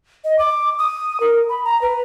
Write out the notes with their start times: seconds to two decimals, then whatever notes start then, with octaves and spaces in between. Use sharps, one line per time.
0.25 D#5
0.39 D6
0.79 D#6
1.20 A#4
1.49 B5
1.64 A#5
1.82 B4